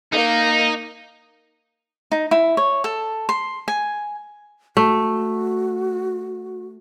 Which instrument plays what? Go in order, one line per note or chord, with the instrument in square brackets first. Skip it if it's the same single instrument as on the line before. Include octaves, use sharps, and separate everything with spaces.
[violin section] A#3 [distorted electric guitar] D#4
[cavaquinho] D#4
E4
C#5
A4
C6
G#5
[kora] A3 [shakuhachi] F#4